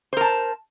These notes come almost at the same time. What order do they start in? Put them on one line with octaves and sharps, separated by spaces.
C5 A#4 A5